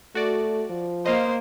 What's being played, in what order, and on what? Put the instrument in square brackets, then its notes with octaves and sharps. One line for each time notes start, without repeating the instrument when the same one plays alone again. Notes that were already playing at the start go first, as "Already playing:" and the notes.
[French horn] A3 [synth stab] F#4 D5
[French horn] F3
[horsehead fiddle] A#3 C5 [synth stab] D#5 F5